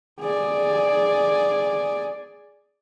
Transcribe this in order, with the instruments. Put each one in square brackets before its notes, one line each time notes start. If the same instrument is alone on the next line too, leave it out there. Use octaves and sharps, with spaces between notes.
[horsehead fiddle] G#4 D5